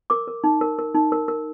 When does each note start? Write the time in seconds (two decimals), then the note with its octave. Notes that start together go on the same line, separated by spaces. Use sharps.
0.10 A#4 D6
0.28 A#4
0.44 D#4
0.61 A#4
0.79 A#4
0.95 D#4
1.12 A#4
1.28 A#4